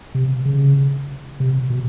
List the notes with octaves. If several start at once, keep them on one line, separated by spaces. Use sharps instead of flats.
C3
C#3
C3
B2